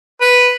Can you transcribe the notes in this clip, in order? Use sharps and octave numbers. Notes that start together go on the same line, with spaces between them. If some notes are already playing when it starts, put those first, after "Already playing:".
B4